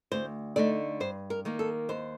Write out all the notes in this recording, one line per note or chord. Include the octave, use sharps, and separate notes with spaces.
D2 C5
D3 A3 D#4 D5
G2 C5
A#4
D#3 A#3
A4
D#2 C5